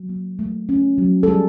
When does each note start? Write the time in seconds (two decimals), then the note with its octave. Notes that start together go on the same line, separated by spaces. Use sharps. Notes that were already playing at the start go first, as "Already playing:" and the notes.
Already playing: F#3
0.09 A#3
0.39 A3
0.69 C#4
0.98 F#3
1.23 A4
1.28 G3 G#4